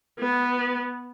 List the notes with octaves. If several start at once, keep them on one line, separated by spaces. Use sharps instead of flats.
B3